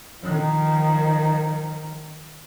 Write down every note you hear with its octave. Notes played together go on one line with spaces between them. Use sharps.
D#3 F3